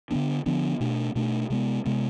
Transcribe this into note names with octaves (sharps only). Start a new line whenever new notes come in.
D3 F3 B3 D4
D3 F3 B3 D4
B2 A3 D4
B2 A3 D4
C3 G#3 B3
C3 G#3 B3